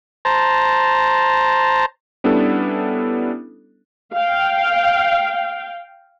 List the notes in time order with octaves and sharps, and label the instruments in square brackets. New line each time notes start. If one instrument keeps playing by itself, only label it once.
[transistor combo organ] C5 A5 A#5
[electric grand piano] G3 B3 C#4 D4 E4 A4
[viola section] F5 G5